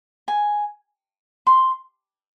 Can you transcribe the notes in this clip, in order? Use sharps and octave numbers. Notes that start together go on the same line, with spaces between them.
G#5
C6